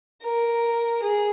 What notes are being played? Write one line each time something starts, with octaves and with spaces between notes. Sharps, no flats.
A#4
G#4